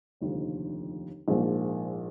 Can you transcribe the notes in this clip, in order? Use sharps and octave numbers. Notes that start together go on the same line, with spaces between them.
F1 D#2 D3 F3
A#1 G#2 F3 A#3